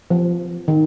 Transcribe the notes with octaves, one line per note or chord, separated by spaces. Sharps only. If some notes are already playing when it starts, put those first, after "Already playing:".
F3
D#3